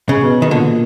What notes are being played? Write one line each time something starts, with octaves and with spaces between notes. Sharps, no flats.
C#3
B2
D#3
A#2 D3